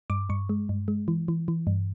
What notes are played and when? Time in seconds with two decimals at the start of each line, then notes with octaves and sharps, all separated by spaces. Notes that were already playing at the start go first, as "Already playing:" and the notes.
0.10 G2 D6
0.29 G2 C#6
0.49 G#3
0.69 G2
0.88 G#3
1.08 E3
1.28 E3
1.48 E3
1.67 G2